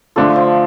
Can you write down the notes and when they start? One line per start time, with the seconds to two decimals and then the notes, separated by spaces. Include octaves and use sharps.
0.16 D3 F3 A3 D4 A4
0.36 F3